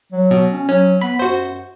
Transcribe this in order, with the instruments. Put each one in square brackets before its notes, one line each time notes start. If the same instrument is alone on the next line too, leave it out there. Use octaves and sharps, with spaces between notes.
[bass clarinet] F#3
[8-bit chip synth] B2
[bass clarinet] C#4
[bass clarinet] F#3 [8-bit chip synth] C#4
[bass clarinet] B3 [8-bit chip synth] B5
[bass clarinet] F#2 [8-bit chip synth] F#4 C5